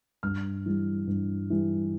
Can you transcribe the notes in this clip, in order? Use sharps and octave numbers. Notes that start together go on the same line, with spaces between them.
G2 F6
E3 G3
G2
E3 G3